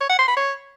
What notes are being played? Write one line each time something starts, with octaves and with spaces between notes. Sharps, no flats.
C#5
F#5
C6
B5
C#5